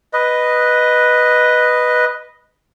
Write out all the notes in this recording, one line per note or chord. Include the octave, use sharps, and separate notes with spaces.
B4 D#5